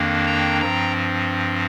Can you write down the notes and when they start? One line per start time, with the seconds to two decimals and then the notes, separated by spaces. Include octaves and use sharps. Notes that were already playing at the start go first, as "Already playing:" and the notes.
Already playing: F2 D#3 A#3 D4
0.26 G5 A#5
0.61 G2 F3 C4 G5 A#5